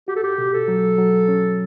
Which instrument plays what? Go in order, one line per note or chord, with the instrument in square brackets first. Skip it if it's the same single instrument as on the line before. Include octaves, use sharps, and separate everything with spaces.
[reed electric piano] F#4 [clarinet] G4
[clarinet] A4
G4
[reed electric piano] B2
[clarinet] A4
[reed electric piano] F#3
F#3
C#4